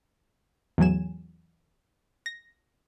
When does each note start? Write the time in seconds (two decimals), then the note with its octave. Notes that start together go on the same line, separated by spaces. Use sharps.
0.78 E2 A2 F#3 G#5 E7
2.26 A#6